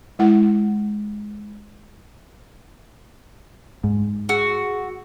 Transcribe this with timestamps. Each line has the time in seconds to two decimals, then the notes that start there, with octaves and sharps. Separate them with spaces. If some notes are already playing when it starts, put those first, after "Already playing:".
0.19 G#3 E4 F#5
3.84 G#2
4.29 F#4 G#4 E6